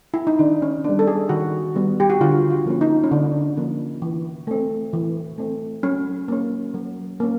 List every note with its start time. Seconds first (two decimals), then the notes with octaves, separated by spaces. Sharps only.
0.14 E4
0.27 D#4
0.39 D#3 D4
0.62 C#4
0.84 G3 B3 D4
0.99 A4
1.07 G#4
1.29 D#3 F#4
1.75 G3 B3
2.00 G4
2.10 F#4
2.21 D3 F4
2.51 F4
2.66 F3 A#3 C#4
2.81 D#4
3.04 C#4
3.12 D3 D4
3.57 F3 A#3 C#4
4.02 E3
4.47 A3 C4
4.93 E3
5.38 A3 C4
5.83 F#3 C#4
6.28 A#3 C#4
6.74 F#3
7.20 A#3 C#4